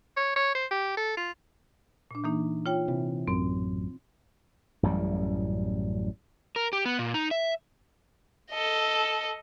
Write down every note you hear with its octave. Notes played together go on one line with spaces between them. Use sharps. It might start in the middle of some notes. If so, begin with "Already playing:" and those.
C#5
C#5
C5
G4
A4
F4
A#2 D4
E3 A#3 D#4
F4 C#5 G5
C3 E3
A1 F#2 C4
A1 F#2 A2 G3
A#4
G4
B3
A#2
D#4
E5
A4 D#5